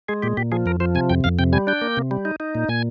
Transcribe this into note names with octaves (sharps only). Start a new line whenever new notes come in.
G#3 G#4
A#2 G4
A#2 G4
F3 G#4
F2 A#4
F3 C5
C3 G#5
F2 G5
F2 F5
C3 G5
G3 G#5
D4 G5
A#3
C3
G3
D#4
D#4
A#2
A#2 G#5